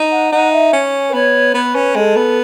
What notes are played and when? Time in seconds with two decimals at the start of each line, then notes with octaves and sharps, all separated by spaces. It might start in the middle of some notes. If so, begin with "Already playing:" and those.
Already playing: D#4
0.11 F#5
0.32 D#4 F#5
0.52 E5
0.73 C#4
1.09 B4
1.14 B3 C#5
1.54 B3 B4
1.75 C#4
1.96 G#3 A4
2.16 B3